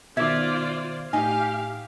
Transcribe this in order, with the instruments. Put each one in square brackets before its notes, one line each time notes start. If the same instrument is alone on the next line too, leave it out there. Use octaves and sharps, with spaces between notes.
[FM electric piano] B2 D#3 [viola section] F4 C5 D5 [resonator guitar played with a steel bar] E5 [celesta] D6 G#6
[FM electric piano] A2 [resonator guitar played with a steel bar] D#4 [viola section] G4 F5 [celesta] G#5